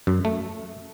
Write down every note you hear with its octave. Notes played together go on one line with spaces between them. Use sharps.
F#2
A3